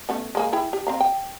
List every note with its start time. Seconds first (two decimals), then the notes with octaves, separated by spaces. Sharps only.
0.09 A3 B3 C#4
0.35 G#3 A#3 G#4
0.53 E4 G#4 G5
0.73 G4
0.87 C4 F5 A#5
1.00 G5